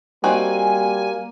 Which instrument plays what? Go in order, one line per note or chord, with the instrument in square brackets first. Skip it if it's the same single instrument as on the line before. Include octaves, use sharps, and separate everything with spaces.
[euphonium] G3 [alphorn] A#3 [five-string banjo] C4 D#4 F#4 [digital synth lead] G#5